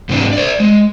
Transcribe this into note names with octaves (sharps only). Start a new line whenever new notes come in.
G#2 C3 E3 G#3 D4
C5 D5
G#3